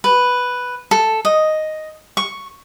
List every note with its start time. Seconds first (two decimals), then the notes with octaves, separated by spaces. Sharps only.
0.04 B4
0.91 A4
1.25 D#5
2.17 C#6